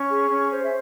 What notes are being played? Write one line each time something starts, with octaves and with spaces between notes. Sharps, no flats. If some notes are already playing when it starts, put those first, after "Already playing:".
Already playing: C#4 C#6
G#4
C#4
C5
E5